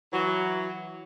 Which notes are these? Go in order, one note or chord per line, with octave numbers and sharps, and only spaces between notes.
E3 F#3